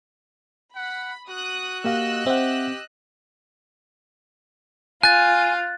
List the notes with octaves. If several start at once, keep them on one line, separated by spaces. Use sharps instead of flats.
F#5 B5
F#4 D#6 F#6
A#3 G4 D#5 F5 E6 F#6
C4 G4 E5 F#5
F4 G#5 F#6 A6